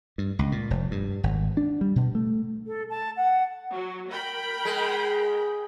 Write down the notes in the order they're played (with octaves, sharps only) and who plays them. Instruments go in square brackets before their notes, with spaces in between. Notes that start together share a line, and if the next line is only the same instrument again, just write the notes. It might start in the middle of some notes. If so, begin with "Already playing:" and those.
[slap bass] G2
C#2
A#2
F1
G2
G#1
D4
G3
B2
A3
[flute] A4
A5
F#5
[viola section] F#3
A#4 G5 B5
[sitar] G#3